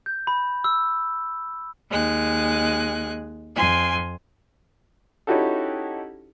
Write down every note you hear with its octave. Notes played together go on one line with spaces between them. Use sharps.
G6
B5
E6
D#2 G#3 F#6
F2 G#5 C6
C#4 D#4 E4 F#4 G4 A4